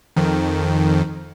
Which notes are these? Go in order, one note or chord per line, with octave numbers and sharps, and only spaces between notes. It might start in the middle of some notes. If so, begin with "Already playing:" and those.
F2 D#3